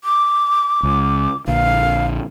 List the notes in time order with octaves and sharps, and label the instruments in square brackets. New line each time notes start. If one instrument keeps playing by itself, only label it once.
[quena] D6
[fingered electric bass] C#2
[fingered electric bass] A#1 D3 [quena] F5